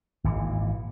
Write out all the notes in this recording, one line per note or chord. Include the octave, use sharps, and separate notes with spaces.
G#1 A#2 E3